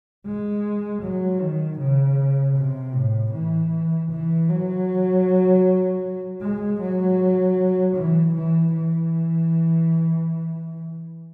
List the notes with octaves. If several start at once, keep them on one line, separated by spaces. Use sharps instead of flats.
G#3
F#3
D#3
C#3
C3
A2
E3
E3
F#3
G#3
F#3
E3
E3
E3